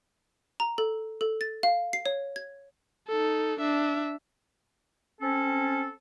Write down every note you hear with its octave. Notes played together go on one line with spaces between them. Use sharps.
A#5
A4
A4
A6
F5
C7
C#5
G#6
D#4 A4
D4 E5
C4 C#4 A4